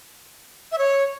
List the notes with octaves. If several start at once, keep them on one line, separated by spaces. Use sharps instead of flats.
E5
C#5